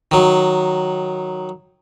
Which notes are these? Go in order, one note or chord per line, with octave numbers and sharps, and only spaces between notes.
D#3 F#3